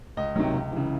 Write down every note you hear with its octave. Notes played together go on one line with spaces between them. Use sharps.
C#2 D#5
C3 D#3 F#3
C#2
C#3 E3